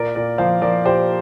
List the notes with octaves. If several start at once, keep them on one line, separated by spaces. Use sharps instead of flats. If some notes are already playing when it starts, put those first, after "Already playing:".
Already playing: A#2 A#4 D5
A#2 A#4 D5
F3 C5 F5
F3 A#4 D5
A#2 G4 C5